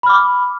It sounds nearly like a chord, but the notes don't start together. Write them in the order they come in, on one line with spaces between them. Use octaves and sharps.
B5 F6 D6